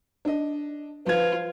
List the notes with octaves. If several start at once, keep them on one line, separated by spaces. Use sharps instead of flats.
D4 D#5
F3 F4 B4 G#6